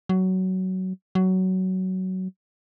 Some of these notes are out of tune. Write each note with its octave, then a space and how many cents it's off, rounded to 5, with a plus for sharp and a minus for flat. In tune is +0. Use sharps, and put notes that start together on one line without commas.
F#3 +15
F#3 +15